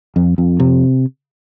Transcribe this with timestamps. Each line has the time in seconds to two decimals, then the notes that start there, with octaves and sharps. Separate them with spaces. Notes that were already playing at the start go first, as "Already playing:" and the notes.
0.16 F2
0.38 F2
0.60 C3